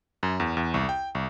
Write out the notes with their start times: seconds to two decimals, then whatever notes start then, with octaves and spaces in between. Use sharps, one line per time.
0.23 F#2
0.40 E2
0.57 E2
0.74 C2
0.89 G5
1.15 C2